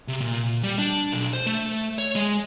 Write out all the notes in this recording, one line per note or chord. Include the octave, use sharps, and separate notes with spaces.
C3
A#2
G3
D4
B1
C5
A3
C#5
G#3